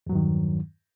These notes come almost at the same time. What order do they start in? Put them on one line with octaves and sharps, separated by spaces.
E2 F#3 G2 D#3